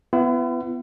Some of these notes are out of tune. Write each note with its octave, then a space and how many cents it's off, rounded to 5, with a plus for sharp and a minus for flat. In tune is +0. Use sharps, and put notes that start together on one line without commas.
B3 +20 E4 +40